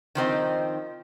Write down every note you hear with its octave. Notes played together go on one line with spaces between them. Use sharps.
D#3 F3 C4 D#4